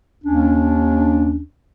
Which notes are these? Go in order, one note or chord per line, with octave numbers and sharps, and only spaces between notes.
D#2 C#4 D4